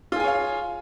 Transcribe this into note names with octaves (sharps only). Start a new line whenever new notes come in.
F4 G#4 C#5 F5 G#5